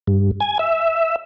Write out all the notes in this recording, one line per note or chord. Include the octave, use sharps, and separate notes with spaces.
G2
G#5
E5